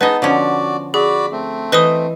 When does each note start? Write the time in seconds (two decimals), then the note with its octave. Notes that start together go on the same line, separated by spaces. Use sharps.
0.01 B3 D#4 G#4 B4 D#5 A5
0.22 D3 F3 C#4 F#4 D5
0.94 F#4 G#4 D5 B5
1.32 A3 C4
1.72 E3 B4 C5 D#5 D#6